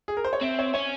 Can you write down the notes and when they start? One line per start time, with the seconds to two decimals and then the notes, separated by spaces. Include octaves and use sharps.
0.08 G#4
0.17 A#4
0.25 C5
0.33 C#5
0.41 C4 E5
0.59 C#5
0.74 C#4 C#5